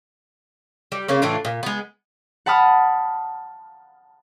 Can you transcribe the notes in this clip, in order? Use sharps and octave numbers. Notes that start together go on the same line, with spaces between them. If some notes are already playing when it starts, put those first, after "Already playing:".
G3
C#3 A#3 C#4
A2 E3 D4 F4
A#2
G#3 B3
F#5 A5 B5 D#6 F6